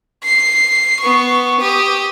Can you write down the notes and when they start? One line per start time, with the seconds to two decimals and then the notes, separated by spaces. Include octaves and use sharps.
0.24 C7
1.00 B3 C#6
1.60 G4 D#6